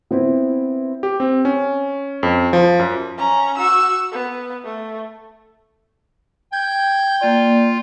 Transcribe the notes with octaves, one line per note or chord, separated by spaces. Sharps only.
B3 C4 E4
G4
C4
C#4
F2
F3
F#2
C#4 A#5
F#4 E6
B3
A3
G5 G6 G#6
A#3 F4 D5